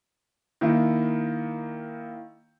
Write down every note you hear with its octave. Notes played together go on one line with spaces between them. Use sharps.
D#3 A#3 E4